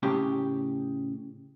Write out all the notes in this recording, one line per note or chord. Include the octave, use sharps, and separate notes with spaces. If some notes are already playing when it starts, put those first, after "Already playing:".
A2 C#3 G4